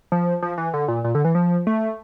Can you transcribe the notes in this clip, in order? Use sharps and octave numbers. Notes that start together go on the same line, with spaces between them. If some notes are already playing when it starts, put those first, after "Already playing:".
F3
F3
E3
D3
A#2
A#2
D3
E3
F3
A3